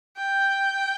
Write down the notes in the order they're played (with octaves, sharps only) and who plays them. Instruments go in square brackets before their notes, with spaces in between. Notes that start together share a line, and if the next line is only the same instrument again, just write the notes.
[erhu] G5